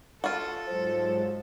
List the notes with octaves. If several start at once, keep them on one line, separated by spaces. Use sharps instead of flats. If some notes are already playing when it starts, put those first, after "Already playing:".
F4 F#4 A4
G#2 F3 F#3 G#3